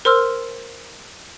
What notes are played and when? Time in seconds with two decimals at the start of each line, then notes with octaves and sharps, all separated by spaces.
0.05 A#4 C5 C6 E6 F6